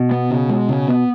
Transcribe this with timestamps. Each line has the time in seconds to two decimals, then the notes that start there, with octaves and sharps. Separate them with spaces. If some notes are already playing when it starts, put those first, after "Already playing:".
Already playing: B2
0.11 B3
0.30 C#3
0.50 G#3
0.69 C#3
0.88 B3